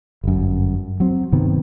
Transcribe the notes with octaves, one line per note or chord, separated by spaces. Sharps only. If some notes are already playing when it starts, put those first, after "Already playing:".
G1 F#2
F#3 C4
G2 C3 D#3 B3